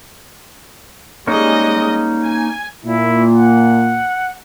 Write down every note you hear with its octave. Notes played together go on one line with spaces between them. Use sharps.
G3 G#3 A#3 C#4 D#4 D#5
G#5
A#2 E4
F#5